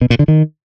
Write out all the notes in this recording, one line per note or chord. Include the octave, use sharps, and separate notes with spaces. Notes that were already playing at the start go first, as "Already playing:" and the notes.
B2
A#2
D3
D#3